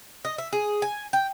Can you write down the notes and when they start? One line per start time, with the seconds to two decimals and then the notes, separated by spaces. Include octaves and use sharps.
0.25 D#5
0.38 E5
0.53 G#4
0.82 G#5
1.13 G5